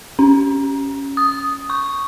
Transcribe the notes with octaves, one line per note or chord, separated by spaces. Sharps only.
C#4
D#6
C#6